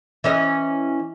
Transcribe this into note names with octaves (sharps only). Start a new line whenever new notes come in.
E3 C#4 D#5